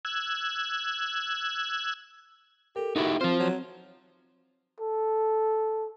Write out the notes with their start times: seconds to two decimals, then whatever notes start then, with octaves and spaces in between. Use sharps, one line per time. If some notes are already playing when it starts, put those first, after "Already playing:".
0.05 E6 F#6 G#6
2.76 G4 A4 A#4
2.96 D#4 E4 F#4 G4
3.21 F3 C4 F4 C5 F6
3.40 F#3
4.81 A4